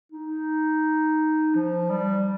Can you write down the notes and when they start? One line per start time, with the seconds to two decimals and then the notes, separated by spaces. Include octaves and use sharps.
0.12 D#4
1.55 F3
1.90 G3